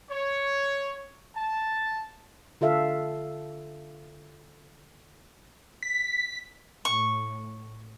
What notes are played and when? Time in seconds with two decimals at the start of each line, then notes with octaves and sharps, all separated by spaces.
0.10 C#5
1.36 A5
2.61 D3 F4 A4 E5 F5
5.83 B6
6.85 A2 C#6